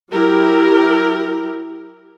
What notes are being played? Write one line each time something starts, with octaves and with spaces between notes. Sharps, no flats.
F#3 E4 G4 A#4